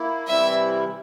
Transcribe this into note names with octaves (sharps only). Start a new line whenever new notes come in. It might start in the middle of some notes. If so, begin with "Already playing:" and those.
Already playing: A#3 E4
C3 E3 G3 C4 E4 E5